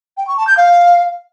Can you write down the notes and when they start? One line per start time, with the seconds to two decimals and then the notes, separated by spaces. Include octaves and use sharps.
0.17 G5
0.27 C#6
0.37 A5
0.47 G6
0.57 F5